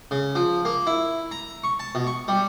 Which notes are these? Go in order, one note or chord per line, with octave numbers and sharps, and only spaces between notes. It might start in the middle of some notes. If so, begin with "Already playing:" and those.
C#3
F3
A#3
E4
A#5
C#6
A5
B2
C#6
G3